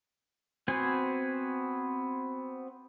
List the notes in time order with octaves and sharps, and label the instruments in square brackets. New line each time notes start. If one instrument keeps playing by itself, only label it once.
[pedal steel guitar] B3 C4 F#4 C5 G#5